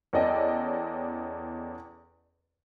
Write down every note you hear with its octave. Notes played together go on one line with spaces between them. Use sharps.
E2 C#4 A4 D5 D#5 G5